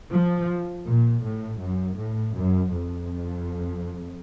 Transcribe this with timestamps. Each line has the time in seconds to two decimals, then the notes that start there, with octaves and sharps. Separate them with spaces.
0.11 F3
0.86 A#2
1.22 A2
1.59 F#2
1.97 A2
2.33 F#2
2.71 F2